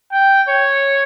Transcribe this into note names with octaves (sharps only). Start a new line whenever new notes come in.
G5
C#5